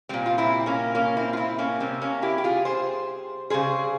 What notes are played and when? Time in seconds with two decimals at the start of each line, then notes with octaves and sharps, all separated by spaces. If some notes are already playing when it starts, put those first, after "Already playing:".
0.09 A#2 G3 C4
0.26 F4
0.38 C4 E4
0.66 A#3 C#4
0.95 A#3 C#4
1.17 C4 E4
1.33 F4
1.37 C4 E4
1.59 A#3 C#4
1.80 C3 G3 C4
2.01 A#3 C#4
2.22 E4 G4
2.38 G4
2.44 F4 G#4
2.65 G#4 C5
3.50 C#3 G3 G#4 C5